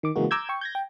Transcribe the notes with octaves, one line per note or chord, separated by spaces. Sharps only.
D#3 D6
C#3 E3 G#3 A#3 F#4
A#5 D6 E6 G6 G#6
G5 C#6
G6 G#6 A#6
G5